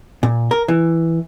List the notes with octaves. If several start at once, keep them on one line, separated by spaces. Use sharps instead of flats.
A#2
A#4
E3